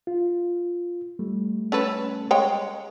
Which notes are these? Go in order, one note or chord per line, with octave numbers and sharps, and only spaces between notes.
F4
G3 A3
C#4 A4 B4
G#3 C#5 G5